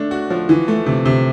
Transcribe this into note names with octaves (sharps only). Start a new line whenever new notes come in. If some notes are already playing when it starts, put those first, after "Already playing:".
Already playing: A3 D4
F#4
F3
E3
A3
C3
C3